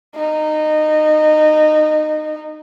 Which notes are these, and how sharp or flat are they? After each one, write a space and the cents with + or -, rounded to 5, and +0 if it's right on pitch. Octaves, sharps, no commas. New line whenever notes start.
D#4 -20